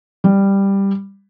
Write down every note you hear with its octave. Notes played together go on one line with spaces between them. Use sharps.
G3